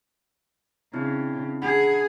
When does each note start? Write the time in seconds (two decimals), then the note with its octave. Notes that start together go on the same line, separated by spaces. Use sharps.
0.94 C#3 C4 D4 E4
1.62 D4 G#4 F#5 B5